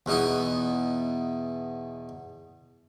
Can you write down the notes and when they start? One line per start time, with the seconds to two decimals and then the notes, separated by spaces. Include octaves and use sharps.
0.06 E2 B2 D#4 E4